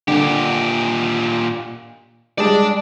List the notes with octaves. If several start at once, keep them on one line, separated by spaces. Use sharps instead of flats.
A#2 D3 G4
G3 G#3 D5 A5